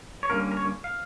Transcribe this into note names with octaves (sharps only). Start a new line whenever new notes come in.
C#5
D3 G3 A#3 C#4 A#4
A#4
C#5
F5